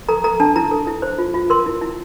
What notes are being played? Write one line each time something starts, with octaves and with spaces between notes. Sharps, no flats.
A4 A#5
A4 A#5
D4 A5
E4 A#5
A4
E4
C5
F4
F4
A#4 C6
E4
E4